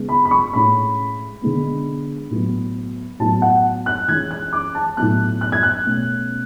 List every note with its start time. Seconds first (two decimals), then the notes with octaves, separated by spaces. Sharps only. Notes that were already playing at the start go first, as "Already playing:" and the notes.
Already playing: C#3 G#3 B3
0.09 B5
0.25 B5
0.31 C#6
0.53 A2 G#3 C#4 B5
1.42 D3 G#3 B3
2.30 A2 F#3 B3
3.19 A2 F#3 B3 A5
3.42 F#5
3.86 F#6
4.08 E3 G#3 C#4 G#6
4.31 F#6
4.53 D6
4.75 A5
4.97 A2 F#3 B3 F#6
5.41 F#6
5.52 G#6
5.63 F#6
5.85 B2 A3 C#4